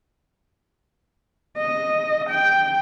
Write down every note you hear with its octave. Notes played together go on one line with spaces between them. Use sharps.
D#5
G5